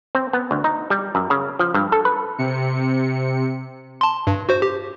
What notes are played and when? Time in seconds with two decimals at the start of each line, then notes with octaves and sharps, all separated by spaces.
0.15 C4
0.33 B3
0.51 D2
0.64 D#4
0.90 G3
1.15 F#2
1.30 C#3
1.59 F3
1.74 G2
1.92 A4
2.05 B4
2.38 C3 C#7
4.01 A5 C6
4.27 G2
4.49 F#4 C5
4.62 G4